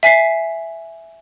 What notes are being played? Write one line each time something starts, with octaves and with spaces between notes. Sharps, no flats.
E5 G#5 B6 C7